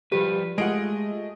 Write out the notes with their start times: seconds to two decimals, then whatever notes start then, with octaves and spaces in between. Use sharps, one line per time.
0.12 F3 G3 G4 B4
0.58 G#3 A3 F4 G#4 D#5 F#5 D7